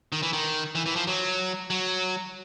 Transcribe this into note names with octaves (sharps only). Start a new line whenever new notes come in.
D#3
E3
D#3
E3
E3
F3
F#3
F#3